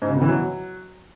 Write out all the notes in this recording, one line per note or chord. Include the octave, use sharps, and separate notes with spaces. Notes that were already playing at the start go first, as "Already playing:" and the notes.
G#2
C#3
B2
E3
F#3